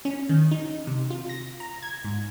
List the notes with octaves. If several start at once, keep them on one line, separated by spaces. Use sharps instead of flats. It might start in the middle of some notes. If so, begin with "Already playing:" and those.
C#4
D#3
D#4
C3
F4
A#6
A#5
G#6
G#2